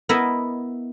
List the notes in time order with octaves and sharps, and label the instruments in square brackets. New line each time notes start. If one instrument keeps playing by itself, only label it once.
[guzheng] B3 E4 A#4 D#5 E5